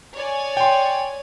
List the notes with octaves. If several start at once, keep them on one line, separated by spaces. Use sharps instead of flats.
C#5 D5 G#5
G5 C6